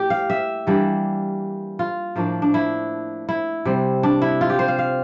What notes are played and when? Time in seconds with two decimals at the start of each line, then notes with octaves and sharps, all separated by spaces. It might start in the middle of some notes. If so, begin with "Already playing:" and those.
Already playing: A2 A#3 G4
0.10 F5
0.30 E5
0.67 E3 G3 A#3 D4
1.79 F4
2.16 A2 F3 A#3 D4
2.42 D4
2.54 E4
3.29 E4
3.65 C3 G3 C4
4.03 D4
4.22 E4
4.41 F4
4.50 G4
4.59 C5
4.68 F5
4.78 F5